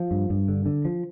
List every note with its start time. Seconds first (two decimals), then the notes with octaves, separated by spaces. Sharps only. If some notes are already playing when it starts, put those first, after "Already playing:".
Already playing: F3
0.11 G2
0.30 G2
0.49 D3
0.66 D3
0.85 F3